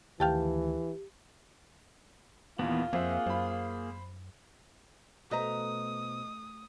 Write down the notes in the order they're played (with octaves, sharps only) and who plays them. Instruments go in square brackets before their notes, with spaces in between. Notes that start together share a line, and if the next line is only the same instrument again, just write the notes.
[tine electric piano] D2 D#3 [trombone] E3 [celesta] G4 [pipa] F5 G5 A5
[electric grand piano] D#2 A#2 [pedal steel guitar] E3 B3 [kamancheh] F4
[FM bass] F2 [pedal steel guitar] A#3 G#4 F#5 [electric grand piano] C4 C5 E5
[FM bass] F#2 [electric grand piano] C5 B5
[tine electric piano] B2 B3 C5 [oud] A3 [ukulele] B4 D#5 A#5 [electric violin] D#6